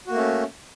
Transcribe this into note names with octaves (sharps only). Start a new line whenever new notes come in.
A3 A#3 C#4 F#4